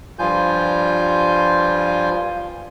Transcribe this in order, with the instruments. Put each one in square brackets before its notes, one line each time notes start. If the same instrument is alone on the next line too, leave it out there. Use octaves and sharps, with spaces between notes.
[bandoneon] G2 F3 G3 F4 G#5 G6